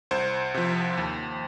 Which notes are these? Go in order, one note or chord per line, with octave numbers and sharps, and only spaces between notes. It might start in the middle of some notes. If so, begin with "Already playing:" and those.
C2 C5
C3 F3
D#2